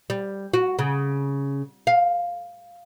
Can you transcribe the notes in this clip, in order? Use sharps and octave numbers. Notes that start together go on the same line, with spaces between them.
G3
F#4
C#3
F5